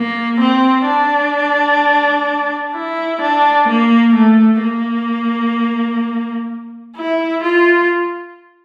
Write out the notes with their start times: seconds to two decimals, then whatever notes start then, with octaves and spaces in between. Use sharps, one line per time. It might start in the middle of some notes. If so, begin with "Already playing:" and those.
Already playing: A#3
0.40 C4
0.87 D4
2.74 E4
3.21 D4
3.68 A#3
4.15 A3
4.62 A#3
6.97 E4
7.43 F4